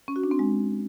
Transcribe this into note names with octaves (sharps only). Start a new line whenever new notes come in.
C#4
F#4
D4
C4
G#3